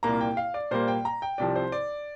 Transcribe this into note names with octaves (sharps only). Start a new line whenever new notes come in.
C2 A#2 A#3 A#5
G5
F5
D5
A#2 G3 A#3 C5
G5
A#5
G5
C2 C3 F3 C4 D5
C5
D5